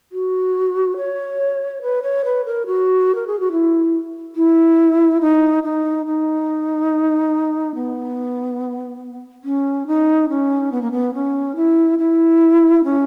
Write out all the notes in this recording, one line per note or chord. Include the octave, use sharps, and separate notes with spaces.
F#4
C#5
B4
C#5
B4
A#4
F#4
A#4
G#4
F#4
E4
E4
D#4
D#4
D#4
B3
C#4
D#4
C#4
B3
A#3
B3
C#4
E4
E4
C#4